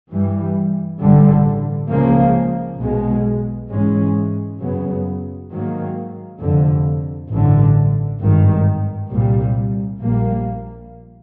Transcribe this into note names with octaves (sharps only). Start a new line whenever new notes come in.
G2 E3 G3
A1 G2 D3 G3
C#2 C#3 F3 A#3
B1 B2 G#3
G#2 E3 G#3 C#4
F#2 C#3 F#3 B3
G#2 D#3 F#3 A#3
F1 F2 D3
A1 G2 D3
G#1 G2 D#3
C2 A#2 G3
A#1 A#2 G3 A#3